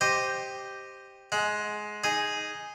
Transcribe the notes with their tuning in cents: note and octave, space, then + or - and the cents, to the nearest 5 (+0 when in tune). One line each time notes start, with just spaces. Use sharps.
G4 +0 C5 +0 D#5 -5
G#3 +15 F#5 -15
D#4 +0 G#4 +0